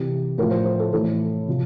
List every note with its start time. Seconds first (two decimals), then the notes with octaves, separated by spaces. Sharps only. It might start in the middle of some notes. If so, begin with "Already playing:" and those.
Already playing: C3 E3 G4
0.38 A2 F3 A#4
0.51 C5
0.66 C5
0.79 A4
0.93 A2 E3 A4
1.48 C3 F3